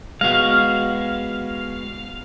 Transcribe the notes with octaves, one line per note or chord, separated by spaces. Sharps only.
G#3 B3 F#4 F5